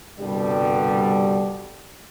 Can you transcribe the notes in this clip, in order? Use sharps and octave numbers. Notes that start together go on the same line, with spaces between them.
C2 G2 B2 D3 G3